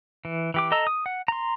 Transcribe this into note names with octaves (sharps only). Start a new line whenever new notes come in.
E3
E3 G4 D6
A4 D#5 A#5 E6
D#6
F#5
A#5 C6